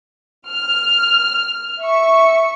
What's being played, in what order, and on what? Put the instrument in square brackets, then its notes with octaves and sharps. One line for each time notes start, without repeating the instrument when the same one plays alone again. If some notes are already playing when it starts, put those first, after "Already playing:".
[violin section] F6
E5 C#6